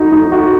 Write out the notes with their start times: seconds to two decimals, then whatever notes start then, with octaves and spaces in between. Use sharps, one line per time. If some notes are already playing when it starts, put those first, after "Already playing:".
Already playing: D#4 F#4
0.12 D#4
0.32 F#4